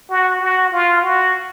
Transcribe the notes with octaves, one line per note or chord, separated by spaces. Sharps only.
F#4
F#4
F4
F#4